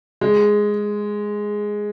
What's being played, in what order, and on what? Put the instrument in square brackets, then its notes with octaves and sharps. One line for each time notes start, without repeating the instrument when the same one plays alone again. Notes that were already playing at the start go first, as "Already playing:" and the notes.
[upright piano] G#3